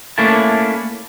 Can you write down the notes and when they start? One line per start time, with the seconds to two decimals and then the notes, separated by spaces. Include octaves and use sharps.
0.18 A3 A#3 C#4 D4 E4 A5